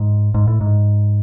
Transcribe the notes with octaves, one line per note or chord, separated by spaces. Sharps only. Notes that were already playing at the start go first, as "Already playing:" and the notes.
Already playing: G#2
G#2
A2
G#2